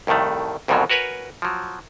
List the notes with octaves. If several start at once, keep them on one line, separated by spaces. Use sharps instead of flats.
C2 F2 A2 D#3 A3
C2 F2 G#2 B2 F3 F#3
F#4 A#4 B4 C#5 G#5
F3 F#3